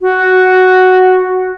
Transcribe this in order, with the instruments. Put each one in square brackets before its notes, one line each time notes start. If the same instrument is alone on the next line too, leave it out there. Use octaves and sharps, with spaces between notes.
[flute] F#4